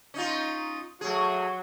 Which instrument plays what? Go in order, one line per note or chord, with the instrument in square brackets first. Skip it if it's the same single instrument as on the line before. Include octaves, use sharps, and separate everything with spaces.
[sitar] C#4 D#4 F4
[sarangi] F#3 [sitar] A3 G#4